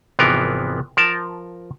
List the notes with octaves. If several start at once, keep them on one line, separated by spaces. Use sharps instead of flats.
G#1 C3 E3 F3 B3 A#4
F3 A#4 A5